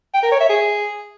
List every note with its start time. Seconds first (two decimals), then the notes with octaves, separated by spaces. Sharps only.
0.14 G5
0.23 A#4
0.32 C#5
0.40 E5
0.49 G#4